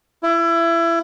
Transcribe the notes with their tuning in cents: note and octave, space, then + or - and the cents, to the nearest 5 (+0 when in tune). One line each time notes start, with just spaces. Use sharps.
E4 +25